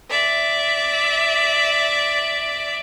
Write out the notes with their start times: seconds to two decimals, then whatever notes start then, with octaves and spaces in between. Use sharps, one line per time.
0.10 D5 E5